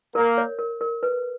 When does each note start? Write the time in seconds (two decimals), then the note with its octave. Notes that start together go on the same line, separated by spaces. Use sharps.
0.15 A#3 A#4
0.38 C#5
0.59 A#4
0.81 A#4
1.03 B4